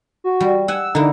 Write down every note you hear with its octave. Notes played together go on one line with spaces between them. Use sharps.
F#4
G3
F#5 G#5 E6
D3 A#3 D#4 E4